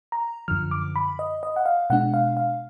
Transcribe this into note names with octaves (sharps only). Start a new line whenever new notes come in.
A#5
F#2 D3 F3 F6
D6
B5
D#5
D#5
F#5
F5
B2 G#3 D4 F#5
F5
F5